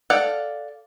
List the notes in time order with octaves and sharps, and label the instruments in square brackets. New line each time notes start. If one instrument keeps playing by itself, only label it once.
[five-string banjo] A4 D5 F5 F#5